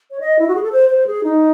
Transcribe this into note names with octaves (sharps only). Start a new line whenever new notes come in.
C#5
D#5
E4
F#4
G#4
A4
C5
C5
G#4
D#4